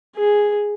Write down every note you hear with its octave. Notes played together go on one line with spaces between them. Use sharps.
G#4